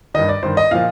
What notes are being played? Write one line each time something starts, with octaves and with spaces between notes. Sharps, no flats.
G2 D#3 D#5
D5
G2 D#3 C5
D#5
A#2 F3 F5